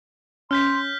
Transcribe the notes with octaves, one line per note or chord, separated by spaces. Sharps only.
C#4 C6 F6 G6 B6